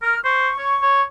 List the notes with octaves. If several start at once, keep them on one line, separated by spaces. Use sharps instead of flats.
A#4 F6
C5 C#6
C#5
C#5